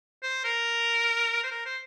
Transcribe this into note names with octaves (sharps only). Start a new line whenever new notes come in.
C5
A#4
C5
A#4
C5